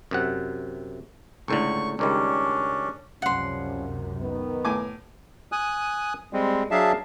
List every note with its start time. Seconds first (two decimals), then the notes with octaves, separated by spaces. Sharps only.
0.11 F#2 C3 F#5
1.48 C#2 A2 D3 C#6
1.99 C#2 D#3 G3 C#4 D4
3.22 C#2 F#2 C3 F3 G3 C#4 F#5 C6
4.20 D#3 B3
4.65 A2 G#5 D6
5.52 G#5 D#6 F#6
6.33 G3 G#3 C4
6.71 F#3 D4 G#4 E5 F5 A5